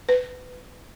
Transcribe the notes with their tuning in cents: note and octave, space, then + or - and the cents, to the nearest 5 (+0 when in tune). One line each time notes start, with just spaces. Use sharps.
B4 +20